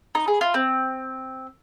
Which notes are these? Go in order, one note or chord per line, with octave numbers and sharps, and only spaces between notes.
D#4
G#4
F4
C4